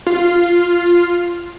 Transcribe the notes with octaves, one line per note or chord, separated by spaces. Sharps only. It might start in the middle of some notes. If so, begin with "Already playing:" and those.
F4